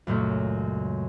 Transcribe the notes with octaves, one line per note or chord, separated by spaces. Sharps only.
C#2 F#2 A#2 A3